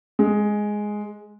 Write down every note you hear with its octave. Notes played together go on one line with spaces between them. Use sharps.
G#3